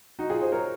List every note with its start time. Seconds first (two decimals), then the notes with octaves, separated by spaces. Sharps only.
0.19 D#4 F#4
0.30 F4 G#4
0.41 G#4 C5
0.52 A#4 C#5